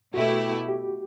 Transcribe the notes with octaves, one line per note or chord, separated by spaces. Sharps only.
B2 A3 E4 F#4 G4
G4